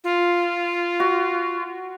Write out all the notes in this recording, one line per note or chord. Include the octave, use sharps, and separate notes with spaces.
F4
F#4